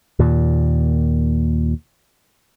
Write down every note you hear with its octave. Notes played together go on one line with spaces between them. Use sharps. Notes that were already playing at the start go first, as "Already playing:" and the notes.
D#2 A#2